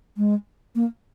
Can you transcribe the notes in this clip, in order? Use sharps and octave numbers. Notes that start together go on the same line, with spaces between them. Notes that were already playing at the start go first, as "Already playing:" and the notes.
G#3
A#3